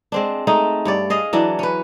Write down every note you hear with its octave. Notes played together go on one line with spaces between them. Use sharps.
G#3 C4 D4
G#3 A3 D#4
G2 C#5 D5
G#4 D#5 F5
E3 F#3 D4
C#4 B4